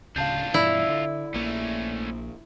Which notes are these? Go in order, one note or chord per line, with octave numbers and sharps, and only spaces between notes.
D1 C#3 D4 F4 F5 A5 G6
G2 B2 E3 E4 D5 E5
D3
A#1 A3 A#3 C#4